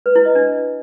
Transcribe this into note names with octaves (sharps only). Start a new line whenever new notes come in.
B4
E4
D#5
D4